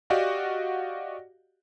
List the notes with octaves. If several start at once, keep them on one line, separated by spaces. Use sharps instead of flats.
F#4 G4 D5 D#5 F5 F#5